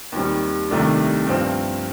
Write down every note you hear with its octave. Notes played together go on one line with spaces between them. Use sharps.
D#2 D#3 G3 C4
C2 C3 D#3 A3 D4
G2 F3 C4